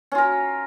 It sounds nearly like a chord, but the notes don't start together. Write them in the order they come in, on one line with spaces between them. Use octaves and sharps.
C#4 F4 A#4